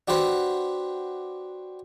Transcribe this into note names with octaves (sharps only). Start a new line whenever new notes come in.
D4 F#4 G4 B4 C5 F#5